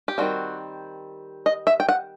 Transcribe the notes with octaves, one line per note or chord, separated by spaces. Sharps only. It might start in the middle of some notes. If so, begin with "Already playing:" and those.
G4
D#3 G3 C4 F#4
D#5
E5
G5
F#5